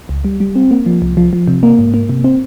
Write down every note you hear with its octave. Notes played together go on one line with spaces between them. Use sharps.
C#2
G3
G3
C4
A#3
F3
C2
F3
F3
C3
A#3
G#2
A#3
C3
C4